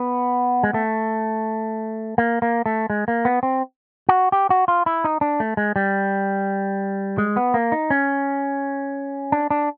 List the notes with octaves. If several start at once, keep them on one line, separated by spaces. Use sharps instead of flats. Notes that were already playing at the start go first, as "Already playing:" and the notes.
Already playing: B3
G#3
A3
A#3
A#3
A3
G#3
A#3
B3
C4
F#4
G4
F#4
F4
E4
D#4
D4
A3
G#3
G3
G#3
B3
A#3
D#4
C#4
D4
D4